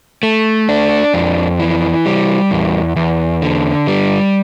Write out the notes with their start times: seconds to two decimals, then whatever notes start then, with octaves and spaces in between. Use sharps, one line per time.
0.23 A3
0.69 D4
1.14 F2
1.59 E3
2.06 G3
2.51 E2
2.96 E2
3.42 D3
3.88 G3